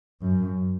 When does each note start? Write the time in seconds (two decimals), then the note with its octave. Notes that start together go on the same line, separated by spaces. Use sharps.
0.21 F#2